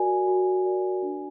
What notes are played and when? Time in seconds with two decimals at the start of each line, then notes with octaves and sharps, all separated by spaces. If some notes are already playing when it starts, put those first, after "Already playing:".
Already playing: F#4 A#4 D5 G#5
0.28 F#4
0.65 A#4 D5
1.02 D4